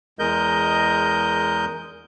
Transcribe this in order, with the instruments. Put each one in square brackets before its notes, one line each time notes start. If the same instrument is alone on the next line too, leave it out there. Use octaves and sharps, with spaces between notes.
[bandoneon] E2 G#3 A#4 D#5 G6